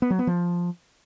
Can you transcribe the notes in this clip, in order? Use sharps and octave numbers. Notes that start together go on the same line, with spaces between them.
B3
F#3
B3
F3